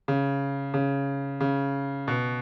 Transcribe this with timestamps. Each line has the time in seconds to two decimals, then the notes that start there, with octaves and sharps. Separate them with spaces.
0.08 C#3
0.74 C#3
1.41 C#3
2.08 B2